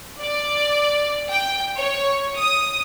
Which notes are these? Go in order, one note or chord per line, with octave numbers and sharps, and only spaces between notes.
D5
G5
C#5
D#6